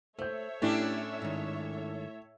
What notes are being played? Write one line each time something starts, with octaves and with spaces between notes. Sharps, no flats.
A3 A4 C5 C#5 E5 G6
A2 A3 C#4 D4 E4 G4
G#2 D#3